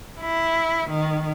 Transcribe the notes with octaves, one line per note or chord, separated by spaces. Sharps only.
E4
D#3